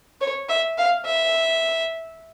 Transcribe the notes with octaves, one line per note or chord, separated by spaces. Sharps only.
C#5
E5
F5
E5